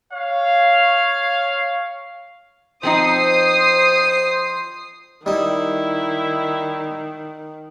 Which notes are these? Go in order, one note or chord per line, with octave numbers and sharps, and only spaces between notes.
C#5 F5
F3 C4 D#4 C5 D#6 C7
D#3 G3 D#4 E4